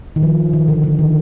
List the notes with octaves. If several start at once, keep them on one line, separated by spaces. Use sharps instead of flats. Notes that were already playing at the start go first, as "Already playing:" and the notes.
D#3
F3
D#3
D3
D3
D#3